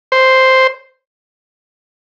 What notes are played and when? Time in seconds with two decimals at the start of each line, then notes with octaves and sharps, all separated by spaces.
0.12 C5